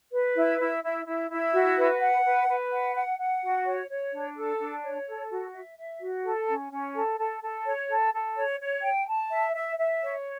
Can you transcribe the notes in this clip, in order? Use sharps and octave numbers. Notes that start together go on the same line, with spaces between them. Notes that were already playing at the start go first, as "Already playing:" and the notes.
B4
E4
E4
E4
E4
E4
F#4
B4
F#5
B4
B4
F#5
F#5
F#5
F#4
C#5
C#5
D4
A4
D4
C#5
A4
F#4
E5
E5
F#4
A4
C#4
C#4
A4
A4
A4
C#5
A4
A4
C#5
C#5
G5
A5
E5
E5
E5
C#5